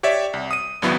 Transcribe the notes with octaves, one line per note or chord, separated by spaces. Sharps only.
G4 C#5 D5 E5
C2
D#6 D#7
G#1 C#2 F#3 B3 E4